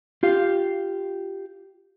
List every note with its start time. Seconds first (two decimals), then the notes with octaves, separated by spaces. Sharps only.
0.23 F4 G4 F5